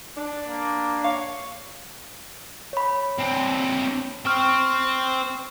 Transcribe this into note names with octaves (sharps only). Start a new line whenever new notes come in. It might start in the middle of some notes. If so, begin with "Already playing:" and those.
D4
A#3
C#5 F5
C#5 B5
C4 D4
C4 G5 C#6 F6